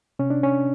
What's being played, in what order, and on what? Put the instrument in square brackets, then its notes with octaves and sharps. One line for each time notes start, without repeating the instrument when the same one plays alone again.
[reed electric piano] C3 C#4
D4
C#4